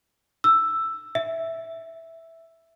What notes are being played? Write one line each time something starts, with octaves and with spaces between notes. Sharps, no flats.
E6
E5